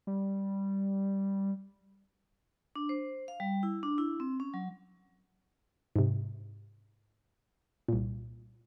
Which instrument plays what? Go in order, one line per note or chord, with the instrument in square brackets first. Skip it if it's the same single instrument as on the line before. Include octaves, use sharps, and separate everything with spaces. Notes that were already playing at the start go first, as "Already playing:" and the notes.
[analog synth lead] G3
[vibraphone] D4
C5
F5
G3
E4
D4
E4
C4
C#4
F#3
[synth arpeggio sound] G#2 C3
C2 A#2